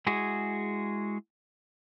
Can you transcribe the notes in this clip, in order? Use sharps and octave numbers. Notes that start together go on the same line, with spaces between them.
G#3 E4 F#4 G#4